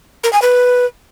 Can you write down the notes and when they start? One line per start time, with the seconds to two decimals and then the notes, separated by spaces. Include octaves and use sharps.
0.24 A#4
0.33 G#5
0.42 B4